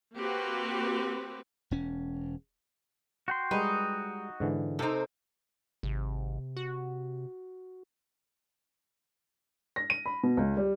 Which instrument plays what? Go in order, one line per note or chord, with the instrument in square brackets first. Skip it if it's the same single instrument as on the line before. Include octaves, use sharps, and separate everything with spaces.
[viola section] A#3 C4 F#4 G4 B4
[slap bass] E1 C#4
[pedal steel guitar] F#4 G5 C6
[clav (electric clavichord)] G3 G#3 [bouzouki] D#4 [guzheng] B4
[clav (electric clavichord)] G#2 D3 E3
[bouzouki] C3 C4 [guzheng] D#4 A4
[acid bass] G#1 [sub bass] C3
[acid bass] F#4
[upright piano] A#6
D#7
B5
B2
C#2
G3